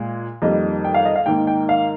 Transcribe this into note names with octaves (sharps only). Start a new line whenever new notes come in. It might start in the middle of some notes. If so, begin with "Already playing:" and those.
Already playing: A#2 G#3
F2 D#3 G3 A#3 D#5
G5
F5
D#5
F5
G#2 D#3 A#3 G5
G5
F5